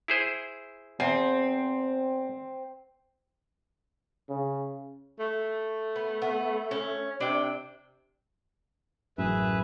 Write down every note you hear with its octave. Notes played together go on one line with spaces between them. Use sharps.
E4 G#4 C5
E2 C4
C#3
A3
B3
B3
C#4
C3 D4 G5
A1 F#2 G#4 B4 E5